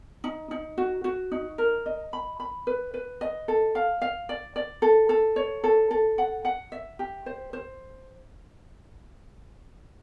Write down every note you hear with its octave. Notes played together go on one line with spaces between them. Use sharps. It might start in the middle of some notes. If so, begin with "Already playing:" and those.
D#4
D#4
F#4
F#4
D#4
A#4
D#5
B5
B5
B4
B4
D#5
A4
F5
F5
D5
D5
A4
A4
C#5
A4
A4
F#5
F#5
E5
G4
C5
C5